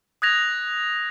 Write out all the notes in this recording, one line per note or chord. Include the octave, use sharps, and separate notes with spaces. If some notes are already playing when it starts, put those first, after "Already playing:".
D#6 F#6 G#6 A#6 F7